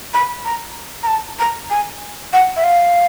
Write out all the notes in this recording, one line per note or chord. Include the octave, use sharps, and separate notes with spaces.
B5
A#5
A#5
A5
A#5
G#5
F#5
E5
F5